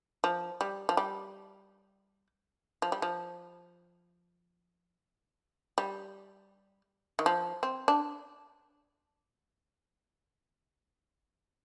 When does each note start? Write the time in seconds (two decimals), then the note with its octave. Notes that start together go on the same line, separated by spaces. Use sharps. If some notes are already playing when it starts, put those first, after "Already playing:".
0.24 F3
0.61 G3
0.89 F3
0.97 G3
2.82 F3
2.92 G3
3.02 F3
5.78 G3
7.19 D#3
7.26 F3
7.63 C4
7.88 D4